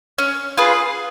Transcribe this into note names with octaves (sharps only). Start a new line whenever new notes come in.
C#4
F4 G#4 B4